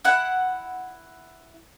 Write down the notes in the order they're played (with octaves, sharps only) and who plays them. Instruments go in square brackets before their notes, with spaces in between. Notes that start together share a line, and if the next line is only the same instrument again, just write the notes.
[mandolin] E4 F#5